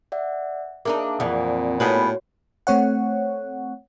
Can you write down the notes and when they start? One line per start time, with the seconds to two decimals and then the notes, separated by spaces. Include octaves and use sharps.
0.12 D5 E5 F#5
0.85 A#3 D4 D#4 G#4 E5 D6
1.20 F2 A#2 E3 D5 F#5 D#6
1.80 A2 B3 F#4 G#4 B4 C#5
2.67 A3 C4 C#5 F#5